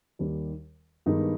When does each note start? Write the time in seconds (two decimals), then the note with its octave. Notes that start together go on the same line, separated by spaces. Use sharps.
0.19 D#2 D#3 G3
1.06 G2 D#3 G#3 B3 D#4